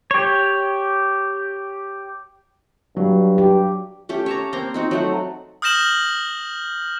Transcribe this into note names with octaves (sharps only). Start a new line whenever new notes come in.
G4 C#5
G2 F#3
G4
A3 C#4 G4
C#5 A5 A#5
A#3 C4 A#5 C6
C4 D#4 F#4
F#3 A3 F#5
D#6 F6 G6 A#6 E7 F#7